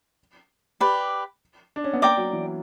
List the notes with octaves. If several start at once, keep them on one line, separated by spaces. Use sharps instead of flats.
G4 B4 D5
D4
C#4
B3
A#3 D5 G5 A#5 D6
F#3
E3